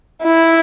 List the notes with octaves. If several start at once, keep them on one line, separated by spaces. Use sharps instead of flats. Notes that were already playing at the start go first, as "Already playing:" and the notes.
E4